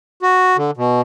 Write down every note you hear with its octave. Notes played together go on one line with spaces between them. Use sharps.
F#4
D3
B2